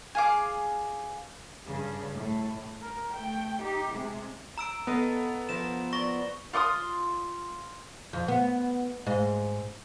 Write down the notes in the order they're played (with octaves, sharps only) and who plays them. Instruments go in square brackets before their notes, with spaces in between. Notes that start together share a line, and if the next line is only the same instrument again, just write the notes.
[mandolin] G#4 F5 D6
[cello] G2 C#3
A2
A#4
A3 G5
D#4 G4
C3 G#3
[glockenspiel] A#5 E6 D7
[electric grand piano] B3 [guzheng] A4 D#5 F5
[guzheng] F3 F4 A#4 [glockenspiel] E7
[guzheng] D5 [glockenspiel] C#6 A#6
[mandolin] F4 C6 D6 D#6
[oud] F2
B3
G#2 D#5